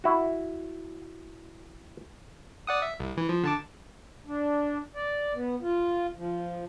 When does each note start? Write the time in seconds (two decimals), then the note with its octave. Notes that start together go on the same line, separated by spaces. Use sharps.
0.04 E4 F#4
2.67 D5 F#5 D#6
2.82 E5
3.00 C2
3.17 E3
3.29 F3
3.43 D3 A5 D6
4.26 D4
4.95 D5
5.34 B3
5.61 F4
6.17 F3